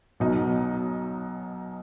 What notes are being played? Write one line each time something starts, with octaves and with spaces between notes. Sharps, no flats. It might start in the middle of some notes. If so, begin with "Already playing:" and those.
B1 B2 F#3 D#4